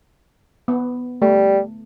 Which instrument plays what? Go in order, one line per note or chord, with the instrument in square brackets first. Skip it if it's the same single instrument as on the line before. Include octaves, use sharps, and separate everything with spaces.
[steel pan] B3
[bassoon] G3 [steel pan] A3